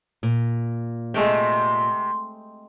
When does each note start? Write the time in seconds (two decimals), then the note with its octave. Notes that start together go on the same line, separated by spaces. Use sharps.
0.23 A#2
1.14 C3 G#3 A3 G5